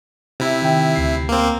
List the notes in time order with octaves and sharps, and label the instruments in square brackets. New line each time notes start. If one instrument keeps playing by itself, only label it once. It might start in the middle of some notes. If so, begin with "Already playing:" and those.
[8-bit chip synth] C3 E4
[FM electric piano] D#3 G5
D2 C7
[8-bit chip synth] A#3 C4